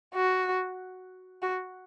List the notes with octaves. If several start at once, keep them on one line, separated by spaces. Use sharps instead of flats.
F#4
F#4